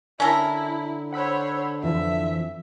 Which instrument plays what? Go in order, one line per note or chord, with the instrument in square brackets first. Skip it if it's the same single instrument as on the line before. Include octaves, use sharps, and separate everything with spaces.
[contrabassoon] D3 [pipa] C#4 A4 A#4 [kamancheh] E4
[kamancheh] C5 C#5 [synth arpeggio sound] F#5 B5 E6
[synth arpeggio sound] F2 E3 F3 [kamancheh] E5